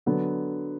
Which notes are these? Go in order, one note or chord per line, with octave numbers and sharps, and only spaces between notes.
D3 F#3 B3